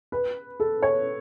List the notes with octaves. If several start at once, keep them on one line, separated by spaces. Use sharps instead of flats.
B4
A4
C#5